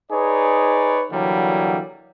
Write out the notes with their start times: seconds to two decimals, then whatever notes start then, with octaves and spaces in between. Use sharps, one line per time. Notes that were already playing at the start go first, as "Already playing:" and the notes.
0.12 D#4 G#4 B4 C#5 D5
1.11 D3 E3 F#3 G3 A#3